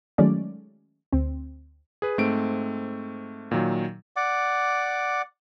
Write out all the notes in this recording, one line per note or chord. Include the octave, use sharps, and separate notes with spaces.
D#3 F#3 G#3 A3 C#4 D5
D2 C4
G#4 B4
G#2 A3 C4 D7
A#2 D#3 F#3
D5 F#5 D6